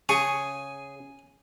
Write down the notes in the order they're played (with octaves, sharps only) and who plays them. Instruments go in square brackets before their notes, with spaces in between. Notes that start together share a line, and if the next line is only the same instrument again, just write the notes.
[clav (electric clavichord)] C#3 [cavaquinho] G#4 [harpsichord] G#5 [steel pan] C#6